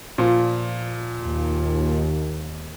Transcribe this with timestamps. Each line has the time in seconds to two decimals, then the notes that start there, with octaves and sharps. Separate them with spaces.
0.18 A#2 F3
1.21 D#2